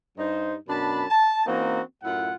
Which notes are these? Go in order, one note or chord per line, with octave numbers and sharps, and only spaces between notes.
G2 D#4 C5
F#2 B2 D4 A5 B5
A5
E3 A#3 C4 C#4 D#4 F#4
F#2 A2 E4 F4 F#5